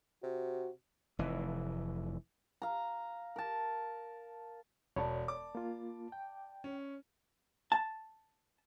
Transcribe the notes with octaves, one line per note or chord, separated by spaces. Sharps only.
C3 F#4
F1 E3
F5 A#5
A#4 A5
E1 C#5 D5 A5 B5
D6
A#3 F4
G5
C#4
A5